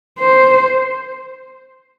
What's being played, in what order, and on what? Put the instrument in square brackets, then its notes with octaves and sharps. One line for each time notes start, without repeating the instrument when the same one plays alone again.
[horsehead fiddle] C5